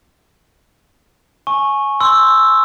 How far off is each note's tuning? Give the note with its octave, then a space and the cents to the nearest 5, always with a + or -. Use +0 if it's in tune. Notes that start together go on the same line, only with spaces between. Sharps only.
G#5 +20 C#6 -10
C6 +0 E6 +0